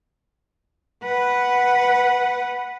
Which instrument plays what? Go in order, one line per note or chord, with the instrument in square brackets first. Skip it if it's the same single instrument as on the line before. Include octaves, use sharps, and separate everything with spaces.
[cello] B4 F#5